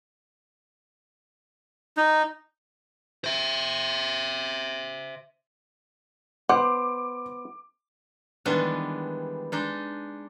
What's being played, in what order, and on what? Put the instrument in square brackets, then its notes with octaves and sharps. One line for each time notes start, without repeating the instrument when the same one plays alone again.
[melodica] D#4
[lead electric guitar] C5 E5
[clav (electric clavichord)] B3 C5 [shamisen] F#5 [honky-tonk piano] D6
[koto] D#3 E3 G3 G#3 B3 D4
G#3 D4 D#4